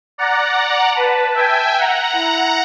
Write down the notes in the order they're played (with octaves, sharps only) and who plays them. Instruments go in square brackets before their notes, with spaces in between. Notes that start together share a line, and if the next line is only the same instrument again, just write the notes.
[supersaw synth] D5 F#5 A#5
[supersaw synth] B4 [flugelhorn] A5
[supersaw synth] E5 G5 G#5
F#5 A#5
[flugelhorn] E4